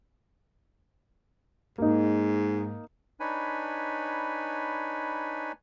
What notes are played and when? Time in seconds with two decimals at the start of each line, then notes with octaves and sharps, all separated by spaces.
1.78 G#2 A#3 D#4
3.20 D4 D#4 B4 C#5 G#5 B5